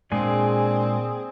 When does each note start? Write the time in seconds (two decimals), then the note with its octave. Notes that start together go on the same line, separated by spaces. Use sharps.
0.12 A#2 G#3 A#3 C4 D4 G#4